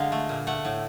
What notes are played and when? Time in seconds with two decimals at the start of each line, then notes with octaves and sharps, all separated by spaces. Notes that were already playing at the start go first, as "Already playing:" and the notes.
Already playing: D3 G#3 F5
0.12 A3
0.29 A#2
0.47 A3 F#5
0.65 A2